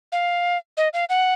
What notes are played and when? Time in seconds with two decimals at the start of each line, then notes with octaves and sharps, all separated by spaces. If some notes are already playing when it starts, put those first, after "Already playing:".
0.12 F5
0.77 D#5
0.93 F5
1.09 F#5